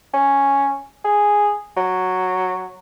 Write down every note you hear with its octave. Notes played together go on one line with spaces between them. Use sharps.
C#4
G#4
F#3